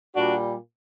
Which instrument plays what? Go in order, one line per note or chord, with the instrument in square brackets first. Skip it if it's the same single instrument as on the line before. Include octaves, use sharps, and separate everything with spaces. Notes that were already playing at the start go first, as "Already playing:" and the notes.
[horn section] A#2 G3 D4 F#4